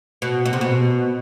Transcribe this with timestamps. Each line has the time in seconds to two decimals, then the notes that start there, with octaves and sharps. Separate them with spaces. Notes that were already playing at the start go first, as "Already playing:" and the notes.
0.22 B2
0.46 B2
0.53 C3
0.61 B2